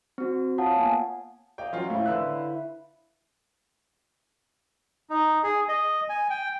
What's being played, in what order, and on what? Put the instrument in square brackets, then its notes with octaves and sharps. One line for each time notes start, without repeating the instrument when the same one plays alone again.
[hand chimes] C4 F#4
F4 C#5 F5 F#5 A5 D#6
A#3 B3 G#5
[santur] D5 D#5 F5 [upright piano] G5
[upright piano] F#3 F4 [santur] C#4 F5
[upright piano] A2 [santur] C4 E4
[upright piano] D3 E6 F#6 [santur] B4
[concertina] D#4
G#4
D#5
G#5
G5